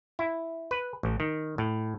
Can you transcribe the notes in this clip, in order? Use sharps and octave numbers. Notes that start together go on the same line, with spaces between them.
E4
B4
A1
D#3
A2